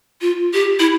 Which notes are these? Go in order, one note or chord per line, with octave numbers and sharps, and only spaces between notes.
F4
G4
E4